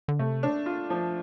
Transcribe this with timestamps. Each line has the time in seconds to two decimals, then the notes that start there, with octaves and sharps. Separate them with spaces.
0.08 D3
0.19 C3 A3
0.43 D4
0.66 F4
0.90 F3